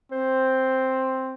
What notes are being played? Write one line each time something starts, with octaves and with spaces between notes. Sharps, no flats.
C4 C5